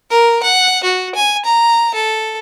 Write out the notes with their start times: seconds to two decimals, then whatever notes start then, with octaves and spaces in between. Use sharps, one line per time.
0.10 A#4
0.43 F#5
0.84 F#4
1.15 G#5
1.45 A#5
1.95 A4